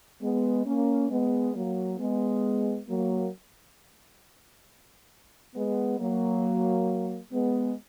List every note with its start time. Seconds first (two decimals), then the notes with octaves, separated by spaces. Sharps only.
0.21 G#3 B3
0.66 A#3 C#4
1.10 G#3 B3
1.54 F#3 A#3
1.99 G#3 B3
2.88 F#3 A#3
5.55 G#3 B3
5.99 F#3 A#3
7.33 G#3 B3